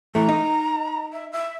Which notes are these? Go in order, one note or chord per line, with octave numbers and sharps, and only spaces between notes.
E3 A3 A#5
D#4
E5
E5